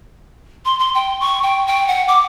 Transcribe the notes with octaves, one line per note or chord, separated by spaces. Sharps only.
C6
C6
G5
C#6
G5
G5
F#5
D6